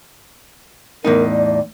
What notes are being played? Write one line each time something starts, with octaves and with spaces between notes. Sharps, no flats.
E2 A2 D#4 A#4
D5